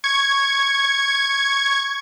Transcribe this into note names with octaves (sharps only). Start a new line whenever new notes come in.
C#6 G#6